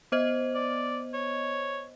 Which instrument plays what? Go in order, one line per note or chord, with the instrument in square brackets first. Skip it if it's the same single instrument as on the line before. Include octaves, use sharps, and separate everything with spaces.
[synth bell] B3 C5 D#5
[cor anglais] D5
C#5